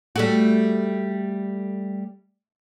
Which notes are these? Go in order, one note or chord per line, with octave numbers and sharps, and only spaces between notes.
G3 A3 F#4